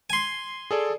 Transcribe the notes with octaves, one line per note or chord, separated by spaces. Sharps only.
G#5 C6
G#4 A4 D5